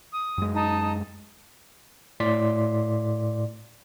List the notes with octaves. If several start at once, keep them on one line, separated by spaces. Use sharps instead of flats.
D#6
F#2 G#3
D#4 A5 D#6
A2 D5 C6 B6